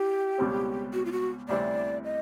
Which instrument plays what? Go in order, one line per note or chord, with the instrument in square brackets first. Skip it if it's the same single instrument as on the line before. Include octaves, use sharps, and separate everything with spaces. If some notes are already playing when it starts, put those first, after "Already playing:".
Already playing: [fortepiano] E3 [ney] G4
[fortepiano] C#2 B2 G3 C4
[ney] F#4
F4
F#4
[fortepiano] D2 C3 E3 G3 C4 [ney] D5
[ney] D#5